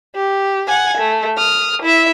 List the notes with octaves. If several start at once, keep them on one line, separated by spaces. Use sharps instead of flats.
G4
F#5 G#5
A3
D#6 F6
E4 E5